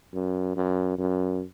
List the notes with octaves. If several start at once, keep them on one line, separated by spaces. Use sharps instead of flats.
F#2
F#2
F#2